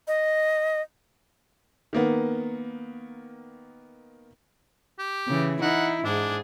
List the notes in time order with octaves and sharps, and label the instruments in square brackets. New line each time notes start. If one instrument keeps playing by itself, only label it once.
[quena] D#5
[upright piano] D#3 A#3 B3
[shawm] G4
[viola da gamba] C#3 E3
[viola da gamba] D#4 E4 [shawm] F#5
[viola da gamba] G#2 G#4 [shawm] D4